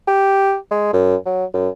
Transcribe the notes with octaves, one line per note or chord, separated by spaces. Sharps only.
G4
G#3
F#2
F#3
F#2